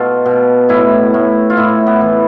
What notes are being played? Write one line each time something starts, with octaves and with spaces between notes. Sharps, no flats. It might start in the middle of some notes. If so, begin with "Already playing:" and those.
Already playing: B2 F4 A4
B2
A2 E4
A2
F4
A2 E4
B3
E3